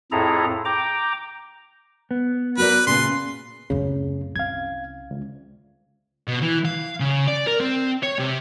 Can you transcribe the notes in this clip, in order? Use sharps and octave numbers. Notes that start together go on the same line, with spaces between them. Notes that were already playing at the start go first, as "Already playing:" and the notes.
F2 A2 E4 G#4 A4 A#5
G5 A#5 D6
B3
F#4 A#4 B4 D5
A#2 C#3 C6
D1 F#2 C#3
C2 C#4 F5 G#6
C#2
B2
E3
F5
C#3
D5
A#4
C4
C#5
C3